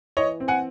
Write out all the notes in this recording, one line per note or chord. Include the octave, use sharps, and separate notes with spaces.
E3 C#5 D#5
C4
F#5 G#5